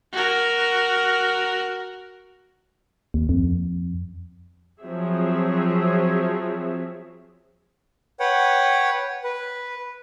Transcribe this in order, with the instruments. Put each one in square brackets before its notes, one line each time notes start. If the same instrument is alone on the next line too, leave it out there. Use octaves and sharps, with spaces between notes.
[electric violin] F#4 A#4
[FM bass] D#2
F2
[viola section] F3 F#3 C4 G#4 C#5 E5
[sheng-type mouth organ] B4 C#5 F#5 G5
B4